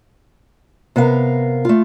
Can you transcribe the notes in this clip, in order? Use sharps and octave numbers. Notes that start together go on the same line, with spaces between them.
C3 B3 A#4 F5
A3 F4